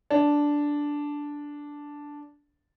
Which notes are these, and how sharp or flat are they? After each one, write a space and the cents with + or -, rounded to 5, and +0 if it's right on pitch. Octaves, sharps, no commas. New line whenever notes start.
D4 -5